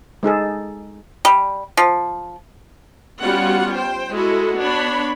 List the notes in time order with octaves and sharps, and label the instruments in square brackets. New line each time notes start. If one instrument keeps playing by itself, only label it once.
[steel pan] G#3 D#4 G#4 A4
[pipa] G3
F3
[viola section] G3 B3 C#4 F4 F#4 F#5
C5 G5
G#3 E4 F#4 A4 D#5
B3 D4 C#5 B5